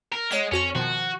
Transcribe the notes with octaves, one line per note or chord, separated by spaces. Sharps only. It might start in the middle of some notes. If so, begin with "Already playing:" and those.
A#4
G#3 C#5 F#5 B6
F2 C#4 F#4 C#6
B2 D#3 F3 F#4